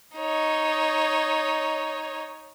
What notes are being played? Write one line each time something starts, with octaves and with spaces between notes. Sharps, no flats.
D#4 C#5